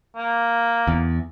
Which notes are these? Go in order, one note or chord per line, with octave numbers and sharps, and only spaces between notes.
A#3
E2